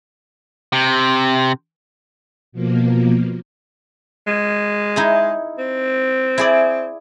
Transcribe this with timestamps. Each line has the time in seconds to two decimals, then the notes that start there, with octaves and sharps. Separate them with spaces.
0.73 C3
2.52 B2 F3 A#3
4.27 G#3
4.96 D#4 E4 G#4
5.58 C4
6.38 E4 G#4 D5